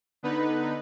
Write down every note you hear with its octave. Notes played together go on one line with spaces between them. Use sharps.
D3 B3 D#4 B4